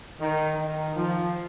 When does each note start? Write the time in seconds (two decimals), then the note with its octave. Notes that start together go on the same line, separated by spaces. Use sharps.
0.20 D#3
0.57 D#3
0.95 F3